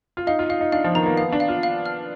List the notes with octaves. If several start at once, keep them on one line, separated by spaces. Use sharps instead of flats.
F4
D#4 F5
F4
D#4 F5
D#4
D4 F5
F3
D#3 A#5
B3
A#3
B3 F5
D4
F5
F4
F5
F6